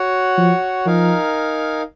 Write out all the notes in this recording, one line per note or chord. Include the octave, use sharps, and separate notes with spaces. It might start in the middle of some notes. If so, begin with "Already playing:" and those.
Already playing: F#4 C#5 F#5
F3
F3 D#4 A#4 F5 G#5